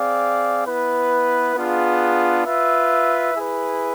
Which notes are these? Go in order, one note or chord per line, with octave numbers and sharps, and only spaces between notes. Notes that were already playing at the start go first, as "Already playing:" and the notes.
Already playing: C4 G#4 D5 F5
B3 E4 B4
B3 D4 F4 G#4
F4 B4 E5
E4 G#4 B4